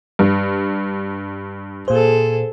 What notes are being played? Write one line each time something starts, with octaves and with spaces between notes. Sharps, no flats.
G2
A#2 G#4 A4 C5